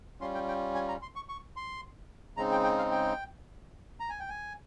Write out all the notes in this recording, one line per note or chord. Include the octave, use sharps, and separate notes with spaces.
G3 C#4 F4 C6
G5
G5
G#5
A#5
C6
C#6
C#6
C6
C#3 G#3 C4 D#4 A#5
G5
G5
F5
G5
A#5
G#5
G5
G#5